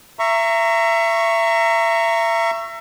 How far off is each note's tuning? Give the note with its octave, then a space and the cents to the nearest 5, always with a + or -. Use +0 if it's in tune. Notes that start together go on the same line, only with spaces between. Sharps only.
E5 +30 A#5 -10 C#6 +0